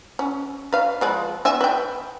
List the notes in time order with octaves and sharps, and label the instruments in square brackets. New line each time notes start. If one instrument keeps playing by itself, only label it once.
[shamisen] C#4
B4 F5
F3 G#3 B4
B3 E5 G#5
B4 G5